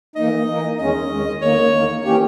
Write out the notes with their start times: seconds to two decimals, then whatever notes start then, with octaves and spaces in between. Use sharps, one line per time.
0.16 E3 A#3 D#4 D#5
0.47 E3 A#3 D#4
0.79 E2 D#3 G#3 C#4 D#5
1.11 E2 D#3 G#3 C#4
1.42 E2 D#3 A#3 C#5
1.74 E2 D#3 A#3
2.05 E3 A#3 C#4 G4 C#5